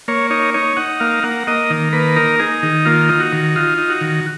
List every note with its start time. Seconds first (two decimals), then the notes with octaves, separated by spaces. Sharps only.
0.08 A#3 C#5
0.30 D#4 C#5
0.54 D#4 C#5
0.77 D#4 F#5
1.00 A#3 F5
1.23 A#3 F#5
1.47 A#3 D#5
1.70 D#3
1.93 A#3 B4
2.16 D#4 A#4
2.39 D#4 G#4
2.63 D#3
2.85 A#3 F4
3.09 D#4
3.20 F#4
3.33 D#3
3.56 D#4 F4
3.78 D#4
3.90 F#4
4.01 D#3